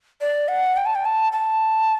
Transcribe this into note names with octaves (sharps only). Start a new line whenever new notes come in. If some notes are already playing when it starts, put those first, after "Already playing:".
D5
F#5
G5
A5
G5
A5
A5